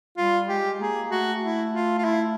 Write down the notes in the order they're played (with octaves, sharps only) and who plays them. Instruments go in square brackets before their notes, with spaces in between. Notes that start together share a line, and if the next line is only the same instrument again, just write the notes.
[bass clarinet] G3 [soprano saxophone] F4
[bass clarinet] G#3 [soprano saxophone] G4
[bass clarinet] A#3 [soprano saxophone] G#4
[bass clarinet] A3 [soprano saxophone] F#4
[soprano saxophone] E4
F4
F4
E4